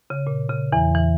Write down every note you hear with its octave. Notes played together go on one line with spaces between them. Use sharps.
C#3
A#2
C#3
E2 E3
E3